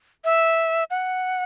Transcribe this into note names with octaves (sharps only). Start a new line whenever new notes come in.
E5
F#5